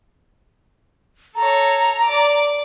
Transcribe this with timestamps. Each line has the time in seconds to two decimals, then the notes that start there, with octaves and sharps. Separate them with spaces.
1.36 A4 C#5 A#5
2.04 D5 D6